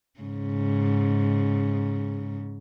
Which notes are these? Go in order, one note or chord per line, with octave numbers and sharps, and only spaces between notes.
G#2 C#3